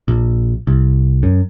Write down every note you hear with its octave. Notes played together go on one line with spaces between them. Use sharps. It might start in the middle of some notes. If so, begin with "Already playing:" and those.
A#1
C2
F#2